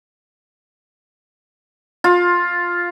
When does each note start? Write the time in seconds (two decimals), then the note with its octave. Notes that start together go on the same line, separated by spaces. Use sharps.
2.04 F4